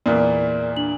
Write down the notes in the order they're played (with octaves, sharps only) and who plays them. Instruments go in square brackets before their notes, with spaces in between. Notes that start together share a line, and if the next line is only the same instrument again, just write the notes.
[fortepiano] E2 A#2 [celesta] A#4 D5
[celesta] D4 F#7